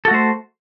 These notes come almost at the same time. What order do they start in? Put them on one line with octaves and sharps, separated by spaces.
A4 F#4 A3 C5